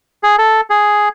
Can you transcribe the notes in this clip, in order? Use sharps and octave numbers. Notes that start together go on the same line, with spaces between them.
G#4
A4
G#4